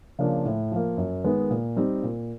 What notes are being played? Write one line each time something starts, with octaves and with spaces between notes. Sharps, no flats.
C#3 F3 A#3 D4
A2
F3 A#3
F#2
D#3 G#3 B3
A#2
G3 C4 D#4
A#2